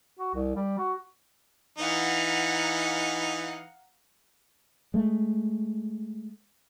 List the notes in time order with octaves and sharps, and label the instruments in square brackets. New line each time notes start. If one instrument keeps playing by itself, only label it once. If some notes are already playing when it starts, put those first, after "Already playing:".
[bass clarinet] F#4
C2
G3
F#4
[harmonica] E3 D#4 [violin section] F5 F#5 A#5
[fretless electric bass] G#3 A3